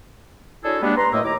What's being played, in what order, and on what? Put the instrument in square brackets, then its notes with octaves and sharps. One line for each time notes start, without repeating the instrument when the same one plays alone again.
[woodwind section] D4 E4 F#4 G#4 A4 C#5
G3 G#3 A#3 B3 D4
B4 A#5 C6
F#2 A2 A3 A#3 D#5 E6
D#2 E4 A#5 D6